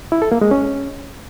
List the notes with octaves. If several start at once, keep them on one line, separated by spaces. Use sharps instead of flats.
E4
A4
A#3
G#3
C#4